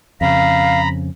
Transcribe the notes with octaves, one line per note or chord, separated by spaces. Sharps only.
F2 C#3 F5 A#5 B5